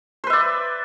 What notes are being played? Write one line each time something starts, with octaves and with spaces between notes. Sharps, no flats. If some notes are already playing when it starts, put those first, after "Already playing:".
B4 C5 D5 E5